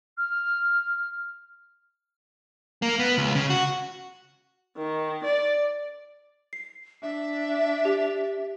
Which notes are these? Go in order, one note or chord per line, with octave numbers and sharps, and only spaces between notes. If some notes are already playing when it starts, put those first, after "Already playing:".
F6
A#3
B3
C#2
C#3
F#4
D#3
D5
C7
D4 E5
G4